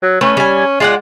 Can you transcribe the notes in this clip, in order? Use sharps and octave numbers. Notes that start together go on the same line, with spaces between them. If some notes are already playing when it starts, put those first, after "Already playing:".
F#3
A3 C#4 B4
G3 G#5
G#3 F4 D5 F#5